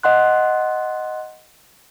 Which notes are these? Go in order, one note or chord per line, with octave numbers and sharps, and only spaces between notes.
D#5 F#5 C6 F#6